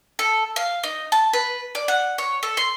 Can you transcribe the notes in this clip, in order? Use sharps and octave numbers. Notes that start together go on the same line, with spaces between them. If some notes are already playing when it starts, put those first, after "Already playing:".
A4
F5
D#4
A5
B4
D5
F#5
C#5
A4
C6